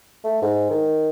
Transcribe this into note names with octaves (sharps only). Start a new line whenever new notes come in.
A3
G#2
D#3